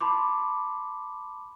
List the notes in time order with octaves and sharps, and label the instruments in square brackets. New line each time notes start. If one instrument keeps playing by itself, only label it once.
[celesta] A5 B5 C6 D6